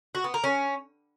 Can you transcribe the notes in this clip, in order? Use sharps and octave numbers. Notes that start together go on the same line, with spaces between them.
F#4
B3
A#4
C#4